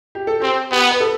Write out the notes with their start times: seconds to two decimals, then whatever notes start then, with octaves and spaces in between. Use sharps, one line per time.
0.15 G4
0.27 A4
0.40 C4 G4
0.71 B3 G4
0.91 B4
1.00 A4